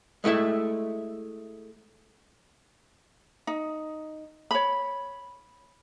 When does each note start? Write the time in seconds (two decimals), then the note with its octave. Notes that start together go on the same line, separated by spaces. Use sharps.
0.24 G#3 A3 E4 E5
3.47 D#4
4.51 C#5 B5